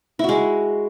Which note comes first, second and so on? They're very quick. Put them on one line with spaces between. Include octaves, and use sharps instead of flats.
E4 F#4 G#3